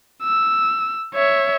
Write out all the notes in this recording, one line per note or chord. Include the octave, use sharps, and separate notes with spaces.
E6
C#5 E5